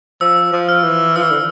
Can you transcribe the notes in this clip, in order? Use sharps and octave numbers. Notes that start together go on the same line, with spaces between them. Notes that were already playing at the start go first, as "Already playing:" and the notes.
F3 E6
F3
F6
E3
F3 E6
E3
D3